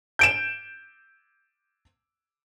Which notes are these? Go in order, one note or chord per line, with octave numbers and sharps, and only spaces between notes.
G6 D7 E7